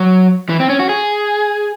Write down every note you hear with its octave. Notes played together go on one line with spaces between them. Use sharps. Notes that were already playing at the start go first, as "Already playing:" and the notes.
Already playing: F#3
E3
C4
C#4
F#4
G#4